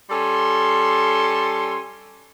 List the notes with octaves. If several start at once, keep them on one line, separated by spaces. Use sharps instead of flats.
G3 C#4 A4 C6